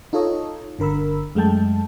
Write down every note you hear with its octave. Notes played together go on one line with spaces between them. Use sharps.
D#4 F4 A4 C#5 D#5
G1 D3 A#4 B5 E6
F#2 G#3 A3 G5 A5